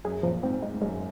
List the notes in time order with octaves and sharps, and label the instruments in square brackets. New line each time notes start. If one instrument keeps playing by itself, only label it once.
[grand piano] F#2 [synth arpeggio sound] G#4
[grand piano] A#2 [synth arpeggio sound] F3
[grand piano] G#2 [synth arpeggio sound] C4
[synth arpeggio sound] G#3
[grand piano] G#2
[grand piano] F#2 [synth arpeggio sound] G#3